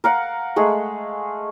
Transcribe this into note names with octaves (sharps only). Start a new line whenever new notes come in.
A#4 F5 F#5
G#3 A3 G#4